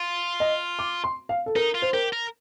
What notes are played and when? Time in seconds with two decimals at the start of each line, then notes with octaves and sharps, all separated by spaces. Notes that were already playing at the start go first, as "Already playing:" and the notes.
Already playing: F4
0.40 D#5
0.79 D6
1.04 C6
1.29 F5
1.46 A4
1.56 D#4 A#4
1.75 F4
1.82 C5
1.93 G4 A#4
2.13 A#4